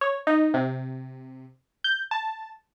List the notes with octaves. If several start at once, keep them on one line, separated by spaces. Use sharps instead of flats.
C#5
D#4
C3
G6
A5